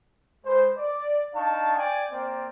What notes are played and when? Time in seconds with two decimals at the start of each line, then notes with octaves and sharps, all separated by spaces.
0.46 G#3 B4 C5
0.77 D5
1.36 D4 D#4 F5 A5 C#6
1.77 D5 G5 G#5
2.12 A#3 C4 D5